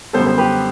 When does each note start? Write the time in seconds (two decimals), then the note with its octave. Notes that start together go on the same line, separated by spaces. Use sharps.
0.13 F#2 D3 G3 B3 A4 C5
0.27 C5
0.38 G4 B4